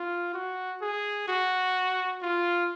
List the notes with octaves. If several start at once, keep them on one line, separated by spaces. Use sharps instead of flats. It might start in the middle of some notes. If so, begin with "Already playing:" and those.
Already playing: F4
F#4
G#4
F#4
F4